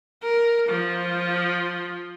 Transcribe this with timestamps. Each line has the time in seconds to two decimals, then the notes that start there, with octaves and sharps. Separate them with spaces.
0.23 A#4
0.69 F3